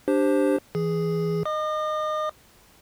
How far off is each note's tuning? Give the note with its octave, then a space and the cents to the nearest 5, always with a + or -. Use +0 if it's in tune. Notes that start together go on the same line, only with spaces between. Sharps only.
D4 +0 G4 +0 C5 +5
E3 +0 G#4 +0
D#5 -15 D#6 -45